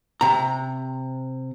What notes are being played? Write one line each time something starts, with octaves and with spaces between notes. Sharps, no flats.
C3 A#5